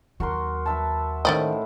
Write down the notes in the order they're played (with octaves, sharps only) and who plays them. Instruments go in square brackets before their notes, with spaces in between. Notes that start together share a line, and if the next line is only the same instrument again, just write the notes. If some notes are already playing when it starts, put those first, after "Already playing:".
[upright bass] D#2 F#3 [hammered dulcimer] F#4 A#4 C6
[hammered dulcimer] B4 E5 A5
[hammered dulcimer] A2 [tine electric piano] D#3 C5 G5 [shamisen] C#4 D5 D#5